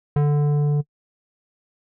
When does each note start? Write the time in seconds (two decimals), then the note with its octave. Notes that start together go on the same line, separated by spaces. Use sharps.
0.16 D3